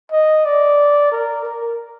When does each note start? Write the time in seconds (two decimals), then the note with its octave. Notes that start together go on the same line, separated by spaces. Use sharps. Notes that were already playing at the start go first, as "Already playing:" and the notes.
0.12 D#5
0.45 D5
1.12 A#4
1.45 A#4